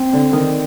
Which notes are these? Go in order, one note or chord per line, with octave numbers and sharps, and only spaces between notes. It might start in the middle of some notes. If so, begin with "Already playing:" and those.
Already playing: C4
D3 D4
D#3 D#4